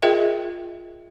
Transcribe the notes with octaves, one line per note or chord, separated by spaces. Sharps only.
F4 G#4 A#4 D#5 E5 G5